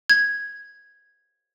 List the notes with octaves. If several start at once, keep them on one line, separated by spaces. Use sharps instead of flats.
G#6